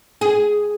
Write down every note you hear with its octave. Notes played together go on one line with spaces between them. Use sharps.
G#4